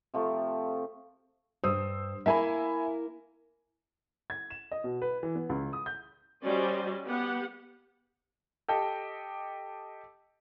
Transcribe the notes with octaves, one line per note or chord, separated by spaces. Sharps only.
C3 F3 A3
G2 C5 D#6 E6
A#3 E4 A#4 E5 G#5 B5
G#6
E7
D#5
B2
B4
E3
B3
C#2
D#6
G6
G3 C#4 F#4 C5 D5 D#5
B3 G4 F#5
G4 A4 D#5 G5 A5